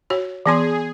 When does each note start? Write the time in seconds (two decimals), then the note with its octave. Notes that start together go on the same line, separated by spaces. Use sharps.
0.10 F#4 C#5
0.46 E3 B3 G#4 C6